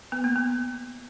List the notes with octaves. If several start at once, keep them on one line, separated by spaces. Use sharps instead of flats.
B3
A#3
B3